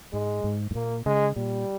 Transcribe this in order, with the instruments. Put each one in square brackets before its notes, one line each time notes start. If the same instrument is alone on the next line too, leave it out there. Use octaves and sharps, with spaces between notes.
[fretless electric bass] G#2 [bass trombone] G#3
[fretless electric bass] G#2
G#2
[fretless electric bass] A#2 [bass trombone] A#3
[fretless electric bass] C#3 [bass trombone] G#3
[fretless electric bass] A#2 [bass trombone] G3